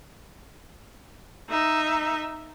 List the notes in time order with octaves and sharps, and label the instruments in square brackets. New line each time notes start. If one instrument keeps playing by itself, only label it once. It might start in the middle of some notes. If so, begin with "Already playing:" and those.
[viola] D#4 E5